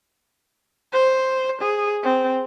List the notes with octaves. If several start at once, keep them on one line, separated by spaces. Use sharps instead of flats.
C5
G#4
C4